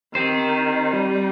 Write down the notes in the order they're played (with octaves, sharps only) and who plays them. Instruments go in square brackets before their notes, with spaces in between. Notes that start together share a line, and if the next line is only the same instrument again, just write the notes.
[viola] D#3 [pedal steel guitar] C4 D#4 G4 C5
[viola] G3